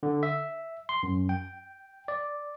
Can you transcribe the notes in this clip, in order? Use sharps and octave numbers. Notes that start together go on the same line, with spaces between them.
D3
E5
C6
F#2
G5
D5